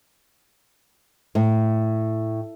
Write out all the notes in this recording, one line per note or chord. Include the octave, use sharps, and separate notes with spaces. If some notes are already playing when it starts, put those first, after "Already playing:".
A2